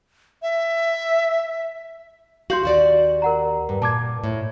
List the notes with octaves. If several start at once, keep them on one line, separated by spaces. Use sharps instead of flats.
E5
F#4 F5 C6 G6 F#7
D#2 F#4 D5
A#4 F#5 A#5
G2
A#2 A5 D6 G#6
A2